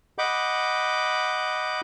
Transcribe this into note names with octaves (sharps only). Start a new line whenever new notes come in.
D#5 F#5 B5 D6 G6